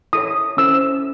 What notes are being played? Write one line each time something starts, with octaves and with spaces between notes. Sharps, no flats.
E4 A4 C#5 D#6
C#4 E4 A4 C5 E6